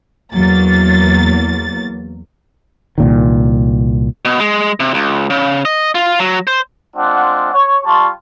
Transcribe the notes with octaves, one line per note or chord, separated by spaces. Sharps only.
E2 F#3 A#3 A6
C2 A#2 D#3
B2
G#3
C3
C#2
C#3
D#5
F4
F#3
C5
G#3 C4 D4 F4 F#5
C#5
G3 F4 G4 A5 C6 C#6